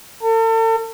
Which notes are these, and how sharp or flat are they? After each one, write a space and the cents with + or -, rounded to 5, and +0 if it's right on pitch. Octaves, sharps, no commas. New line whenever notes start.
A4 +40